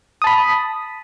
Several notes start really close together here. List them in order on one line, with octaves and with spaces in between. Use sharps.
D#6 A5 B5